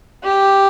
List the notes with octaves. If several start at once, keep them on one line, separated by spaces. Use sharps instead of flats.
G4